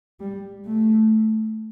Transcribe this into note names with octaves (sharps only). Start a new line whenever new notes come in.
G3
A3